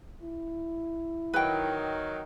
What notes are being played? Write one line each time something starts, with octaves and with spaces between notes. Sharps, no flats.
E4
D#3 F#3 B4 G5